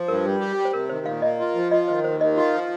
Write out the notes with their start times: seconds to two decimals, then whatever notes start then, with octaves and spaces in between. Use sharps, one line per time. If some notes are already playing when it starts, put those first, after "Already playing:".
Already playing: F3
0.08 G2 A#4
0.24 G3
0.40 G4
0.57 G3
0.65 C5
0.74 C3 A#4
0.90 D#3 C5
1.06 A#2 F5
1.22 A#3 D#5
1.39 F4
1.55 F3
1.71 F4 D#5
1.88 D#3 C5
2.04 D#2 C5
2.20 D#3 D#5
2.36 F4
2.53 F3